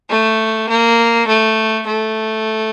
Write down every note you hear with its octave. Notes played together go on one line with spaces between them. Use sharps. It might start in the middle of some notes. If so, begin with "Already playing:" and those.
A3
A#3
A3
A3